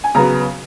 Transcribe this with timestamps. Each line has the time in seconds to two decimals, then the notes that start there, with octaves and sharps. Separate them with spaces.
0.04 G#5
0.15 C#3 F#3 B3 A#5